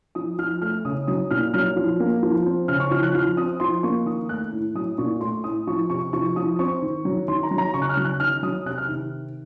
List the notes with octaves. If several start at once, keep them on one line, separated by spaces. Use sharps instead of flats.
F3 D#6
F3 F6
A3 F6
C#3 D#6
F#3 D#6
A#2 F6
F#3 F6
F3
A#3
F3
C4
C#3 F6
C#6
F3 F6
F#6
F3 F6
C4 D#6
F3 C6
A#3 C#6
D#3 D#6
A3 F#6
A2
F#3 D#6
A#2 C#6
A3 C6
A2 D#6
F3 C#6
C3 C#6
F3 C#6
F3 D#6
C4 C#6
D#3
F#3
D#3 C6
A#5
F#3
A#5
C#3 C#6
F#6
F6
F#3
F#6
D#3 F6
F#3 D#6
C3 F#6
F6
D#3